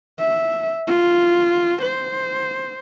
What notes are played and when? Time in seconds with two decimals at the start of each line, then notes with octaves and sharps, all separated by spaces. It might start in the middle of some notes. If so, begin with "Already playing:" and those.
0.19 E5
0.88 F4
1.82 C5